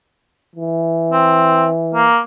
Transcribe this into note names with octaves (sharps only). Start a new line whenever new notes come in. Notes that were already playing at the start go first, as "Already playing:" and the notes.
E3
C4
A#3